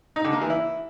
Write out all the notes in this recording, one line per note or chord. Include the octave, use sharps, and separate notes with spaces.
D#4
D3
A#3
E3
E4